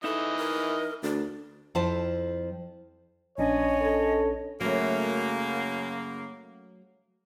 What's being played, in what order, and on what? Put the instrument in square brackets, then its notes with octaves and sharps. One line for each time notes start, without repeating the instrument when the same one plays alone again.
[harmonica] E3 D#5 [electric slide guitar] D#4 E5 [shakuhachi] A4
[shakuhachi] A#4
[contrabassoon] D2 [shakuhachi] D5
[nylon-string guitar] F2 F3 E4 A4 C5 A5
[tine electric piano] A#1 C#4 D4 [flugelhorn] C#5 [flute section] D#5 G#5 B5
[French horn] A4
[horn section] F#2 C#3 A#3 [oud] F#3 A3